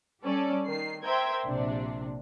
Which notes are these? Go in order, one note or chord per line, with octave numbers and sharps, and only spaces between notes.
G3 C#4 A4 D5
D#3 C7
A#4 C5 E5 G5 G#6
A#1 C3 D4